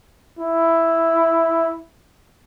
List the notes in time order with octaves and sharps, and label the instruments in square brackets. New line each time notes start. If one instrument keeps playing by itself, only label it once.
[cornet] E4